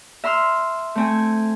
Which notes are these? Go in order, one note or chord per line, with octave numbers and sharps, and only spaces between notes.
E5 A#5 C6 E6 F6
A3 C4 G#5